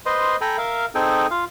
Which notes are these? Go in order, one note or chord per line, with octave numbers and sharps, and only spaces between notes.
B4 C5 D#5 C6
A4 G5 G#5 A#5 B5
A#4 E5 F5
C4 D#4 G#4 A4 G5 G#5
F4 F5